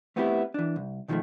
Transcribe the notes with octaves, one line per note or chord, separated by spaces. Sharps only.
A3 B3 C4 D#4 E4 G4
E3 D4
C2
B2 D#3 F3 F#3 G#3 A3